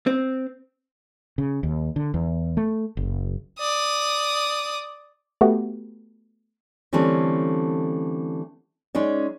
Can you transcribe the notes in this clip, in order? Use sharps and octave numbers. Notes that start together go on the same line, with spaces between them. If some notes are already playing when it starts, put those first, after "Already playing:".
C4
C#3
D#2
D3
E2
A3
F#1
D5 D#6
A3 B3 F#4 G4
D3 E3 G3 A3 C4 C#4
G#3 C#4 D#4 D5